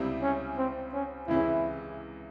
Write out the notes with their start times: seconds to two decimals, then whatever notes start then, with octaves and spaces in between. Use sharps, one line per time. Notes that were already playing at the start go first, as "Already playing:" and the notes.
Already playing: C#2 C3 G3 C4 E4
0.22 C#4
0.57 C4
0.93 C#4
1.28 C#2 C3 E3 G#3 C#4 E4